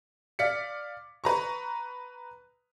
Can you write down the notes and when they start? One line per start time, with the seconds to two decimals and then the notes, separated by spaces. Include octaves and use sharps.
0.39 D5 F5 B6 C#7
1.24 B4 A#5 C#6